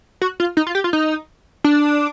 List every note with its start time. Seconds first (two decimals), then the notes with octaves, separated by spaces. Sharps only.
0.21 F#4
0.40 F4
0.57 D#4
0.67 F4
0.75 G4
0.84 F4
0.93 D#4
1.64 D4